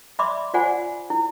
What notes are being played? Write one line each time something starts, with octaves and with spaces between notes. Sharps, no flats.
D5 E5 B5 C6 D6
F4 C5 D5 F#5 G#5
F#5
E4